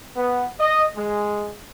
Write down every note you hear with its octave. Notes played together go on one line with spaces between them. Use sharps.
B3
D#5
G#3